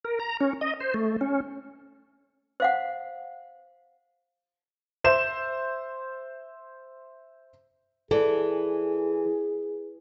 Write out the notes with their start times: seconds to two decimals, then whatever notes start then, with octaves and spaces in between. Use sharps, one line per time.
0.05 A#4
0.20 A#5
0.41 C#4
0.61 D#5
0.81 C5
0.94 A3
1.21 C#4
2.60 C5 F5 F#5
5.04 C5 E5 E7
8.11 E3 G#4 A4 D5